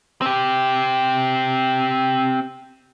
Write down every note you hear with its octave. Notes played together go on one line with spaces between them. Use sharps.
C4 G4